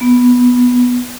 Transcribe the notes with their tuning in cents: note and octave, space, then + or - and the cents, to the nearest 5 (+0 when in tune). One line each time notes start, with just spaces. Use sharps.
B3 -5